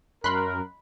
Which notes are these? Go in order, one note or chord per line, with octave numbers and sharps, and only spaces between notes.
F#2 A#4 B5 C6 F#6